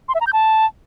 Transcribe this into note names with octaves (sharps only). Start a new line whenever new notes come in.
C6
E5
A#5
G6
A5